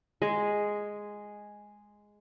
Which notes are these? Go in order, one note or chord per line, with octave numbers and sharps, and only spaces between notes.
G#3 G#4